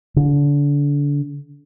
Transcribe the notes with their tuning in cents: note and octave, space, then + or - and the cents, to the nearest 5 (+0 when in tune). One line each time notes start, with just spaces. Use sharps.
D3 -30